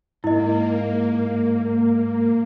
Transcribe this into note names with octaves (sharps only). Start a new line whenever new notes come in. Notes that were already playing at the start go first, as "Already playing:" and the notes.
G#2 A#3 E4 D#5